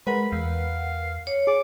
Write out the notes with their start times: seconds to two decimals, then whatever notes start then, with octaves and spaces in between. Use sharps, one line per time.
0.07 G#3 A#4 B4 F#5 B5
0.32 E2 F5
1.27 C#5
1.47 G#4 D6